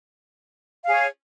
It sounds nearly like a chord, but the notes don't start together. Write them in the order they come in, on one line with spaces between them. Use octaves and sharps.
F5 G#4 C#5